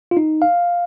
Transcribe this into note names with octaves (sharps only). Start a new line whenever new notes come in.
F4
D#4
F5